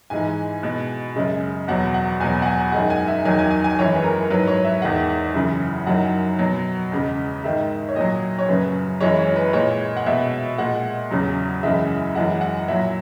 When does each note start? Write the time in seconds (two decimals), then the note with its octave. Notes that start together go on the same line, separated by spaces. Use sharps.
0.10 G#2 E3 G#3 G#5
0.63 B2 G#3
1.16 F#2 C#3 G#3
1.68 E2 B2 F#3 F#5
1.94 F#5
2.20 E2 B2 F#3 G#5
2.42 F#5
2.46 G#5
2.72 F#2 D#3 G#3 F#5
2.90 G#5
3.08 E5
3.25 E2 D#3 F#3 G#5
3.39 G#5
3.51 G#5
3.64 G#5
3.78 F#2 E3 G#3 C#5
3.92 B4
4.04 A#4
4.30 G#2 F#3 B4
4.48 C#5
4.64 E5
4.82 E2 D#3 G#3 F#5
5.34 F#2 C#3 E3
5.86 F#2 D#3 F#3 F#5
6.39 B2 F#3
6.92 E2 C#3 G#3
7.44 G#2 D#3 G#3 E5
7.89 C#5
7.96 A#2 F#3 D#5
8.39 C#5
8.49 F#2 C#3 F#3 B4
9.01 F#2 E3 G#3 C#5
9.19 C#5
9.36 B4
9.53 A#2 G#3 C#5
9.97 F#5
10.06 B2 G#3 E5
10.58 A#2 G#3 F#5
11.11 E2 C#3 F#3
11.63 F#2 C#3 E3 G#3 E5
12.15 F#2 E3 G#3 F#5
12.41 F#5
12.68 A#2 F#3 E5